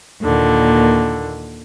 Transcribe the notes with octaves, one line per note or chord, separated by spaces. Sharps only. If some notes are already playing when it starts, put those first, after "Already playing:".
D#2 A#2 D3